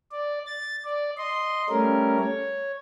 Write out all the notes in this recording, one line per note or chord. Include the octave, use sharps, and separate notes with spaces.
D5
A6
D5
D#5 C6
G3 A3 C#4 A#4
C#5